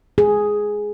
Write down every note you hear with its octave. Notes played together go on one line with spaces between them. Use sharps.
G#4